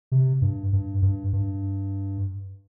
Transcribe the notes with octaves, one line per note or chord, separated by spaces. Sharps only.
C3
G2
G2
G2
G2